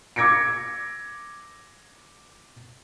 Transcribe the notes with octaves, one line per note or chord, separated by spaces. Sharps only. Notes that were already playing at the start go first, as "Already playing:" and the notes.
D6 E6 G#6 A#6 C#7 D7